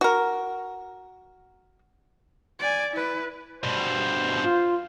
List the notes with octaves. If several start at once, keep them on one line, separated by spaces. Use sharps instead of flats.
F#4 A#4
D5 G#5
E4 B4
G2 B2 C5
F4